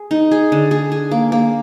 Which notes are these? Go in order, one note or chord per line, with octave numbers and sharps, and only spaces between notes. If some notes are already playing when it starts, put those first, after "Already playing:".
Already playing: G#4
D#4
G#4
D3
G#4
G#4
A#3
A#3